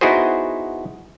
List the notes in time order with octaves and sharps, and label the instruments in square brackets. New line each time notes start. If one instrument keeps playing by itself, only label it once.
[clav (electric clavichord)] B3 D#4 E4 F#4 G#4 C5